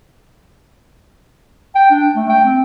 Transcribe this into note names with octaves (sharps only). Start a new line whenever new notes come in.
G5
D4
A3
G5
C4